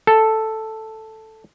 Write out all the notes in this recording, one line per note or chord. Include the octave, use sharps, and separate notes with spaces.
A4